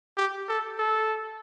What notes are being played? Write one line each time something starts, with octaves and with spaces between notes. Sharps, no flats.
G4
A4
A4